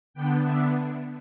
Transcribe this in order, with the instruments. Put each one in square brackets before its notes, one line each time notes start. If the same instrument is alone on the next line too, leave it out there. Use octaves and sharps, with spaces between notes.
[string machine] D3 B3 D4 G5
D3 B3 D4 E5